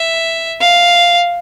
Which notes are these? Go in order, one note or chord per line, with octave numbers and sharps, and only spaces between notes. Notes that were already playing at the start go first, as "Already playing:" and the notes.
Already playing: E5
F5